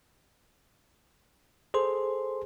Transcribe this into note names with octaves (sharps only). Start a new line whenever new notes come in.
G#4 A4 C5 C6